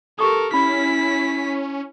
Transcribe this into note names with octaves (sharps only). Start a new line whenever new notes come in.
G4 A4 A#4 C#6 D#6
C#4 E4 B5 B6